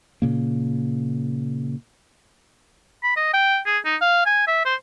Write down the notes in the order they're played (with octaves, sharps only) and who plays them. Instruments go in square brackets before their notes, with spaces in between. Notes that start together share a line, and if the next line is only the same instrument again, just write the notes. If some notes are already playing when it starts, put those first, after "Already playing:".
[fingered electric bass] A#2 C#3 A#3
[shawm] B5
D#5
G5
G#4
D#4
F5
G#5
E5
C5